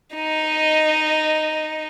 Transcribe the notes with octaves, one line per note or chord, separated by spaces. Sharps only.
D#4 D#5